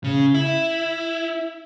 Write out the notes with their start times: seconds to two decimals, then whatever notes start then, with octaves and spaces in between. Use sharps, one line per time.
0.04 C#3
0.35 E4